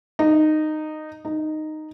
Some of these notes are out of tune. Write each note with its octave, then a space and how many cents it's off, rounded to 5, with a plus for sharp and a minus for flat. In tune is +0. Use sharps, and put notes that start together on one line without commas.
D#4 -15
D#4 -10